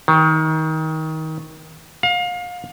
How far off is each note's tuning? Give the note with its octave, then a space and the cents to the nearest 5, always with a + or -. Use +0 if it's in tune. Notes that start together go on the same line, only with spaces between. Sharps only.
D#3 +25
F5 +30